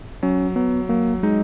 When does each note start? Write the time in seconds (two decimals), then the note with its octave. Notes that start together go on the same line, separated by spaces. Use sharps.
0.23 F#3 C#4
0.56 F#3 B3
0.89 F#3 A#3
1.23 G#3 D#4